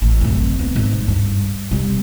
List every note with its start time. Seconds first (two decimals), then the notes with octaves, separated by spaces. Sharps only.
0.02 A1
0.21 F#2 C3
0.59 B3
0.76 G#2
1.08 G2
1.71 C3 G3